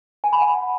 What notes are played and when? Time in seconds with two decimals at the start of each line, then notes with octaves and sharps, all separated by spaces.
0.24 G#5
0.33 B5
0.41 F#5